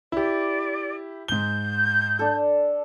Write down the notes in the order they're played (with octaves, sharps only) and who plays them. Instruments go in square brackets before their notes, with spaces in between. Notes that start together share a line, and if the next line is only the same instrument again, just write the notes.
[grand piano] E4 G4 [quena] D5
[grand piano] G#2 G7 [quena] G6
[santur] D4 A4